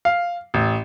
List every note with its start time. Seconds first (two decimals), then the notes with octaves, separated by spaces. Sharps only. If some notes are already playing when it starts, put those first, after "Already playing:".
0.05 F5
0.54 A1